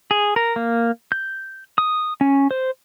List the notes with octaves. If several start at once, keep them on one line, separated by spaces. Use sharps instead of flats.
G#4
A#4
A#3
G6
D#6
C#4
C5